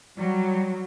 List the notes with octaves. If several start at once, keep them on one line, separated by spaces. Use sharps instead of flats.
F#3 G3